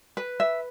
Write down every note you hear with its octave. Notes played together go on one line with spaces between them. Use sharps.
B4
E5